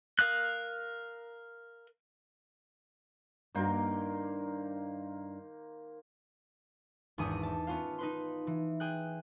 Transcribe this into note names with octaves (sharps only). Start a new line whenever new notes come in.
A#4 F5 D#6 F#6
G2 D#3 A#3 D4 F#4 C5
G#1 E2 D4 G#4 D#6
A5
B3 C#4 F4 F5
D#4 B4 C6
E3
G#4 G5 F#6